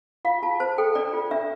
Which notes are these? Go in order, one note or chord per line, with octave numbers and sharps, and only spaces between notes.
F4 F5
F4 A5
C5 A5
A4 G5
D4 D5
F4
D4 E5